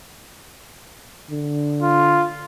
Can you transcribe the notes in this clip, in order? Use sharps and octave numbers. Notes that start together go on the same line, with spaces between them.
D3
F4